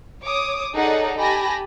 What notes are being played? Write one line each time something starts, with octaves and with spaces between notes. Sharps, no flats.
C#5 D6 D#6
D#4 G#4 A4 C#5 D5 F#5
G4 G#5 A5 B5 A#6